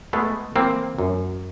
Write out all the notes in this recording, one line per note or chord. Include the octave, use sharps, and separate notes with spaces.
G#3 A3 B3
E3 A#3 C4
F#2